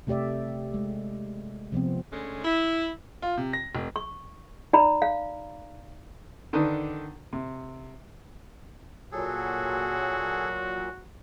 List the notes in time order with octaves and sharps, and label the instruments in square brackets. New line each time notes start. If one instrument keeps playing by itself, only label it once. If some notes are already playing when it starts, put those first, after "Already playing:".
[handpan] C3 A3 G4 D5 E5
G#3
C3 F3 B3 C4
[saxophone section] D3 G#3 A3 C#4
E4
[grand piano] F4
C3
A#6
F1
[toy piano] C#6
D#4 D5 A#5 B5
F5
[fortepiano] D3 D#3 D4 D#4 B4 D#6
C3
[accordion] A#2 F#3 [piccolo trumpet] F#4 [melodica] G#4 A4